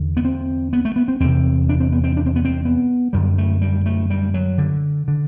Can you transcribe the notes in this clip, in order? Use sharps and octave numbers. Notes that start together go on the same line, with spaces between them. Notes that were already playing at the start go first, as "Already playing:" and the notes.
Already playing: E2 D3
B3
C4
B3
A3
B3
C4
E2 C3 C4
D4
C4
B3
C4
D4
C4
B3
C4
B3
F#2 D3 G3
A3
G3
A3
G3
F#3
D3
D3